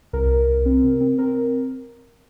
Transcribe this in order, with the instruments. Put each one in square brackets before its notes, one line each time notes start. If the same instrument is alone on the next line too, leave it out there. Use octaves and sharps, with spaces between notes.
[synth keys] C2 A#4
C2
C2
C4
C3
C4
C4 A#4